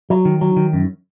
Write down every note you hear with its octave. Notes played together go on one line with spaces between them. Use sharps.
F#3
D#3
F#3
D#3
F#2